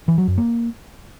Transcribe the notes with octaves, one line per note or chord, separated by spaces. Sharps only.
E3
F#3
F#2
A#3